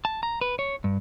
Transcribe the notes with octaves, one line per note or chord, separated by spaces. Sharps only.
A5
A#5
B4
C#5
G2